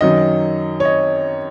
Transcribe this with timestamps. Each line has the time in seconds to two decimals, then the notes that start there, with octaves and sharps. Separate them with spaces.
0.01 F#2 D#3 F#3 D#5
0.80 C#5
0.85 D#5